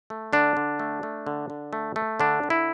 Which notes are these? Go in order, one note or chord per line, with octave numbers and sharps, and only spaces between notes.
A3
D3 D4
D3
A3
A3
D3
D3
A3
A3
D3 D4
D3
E4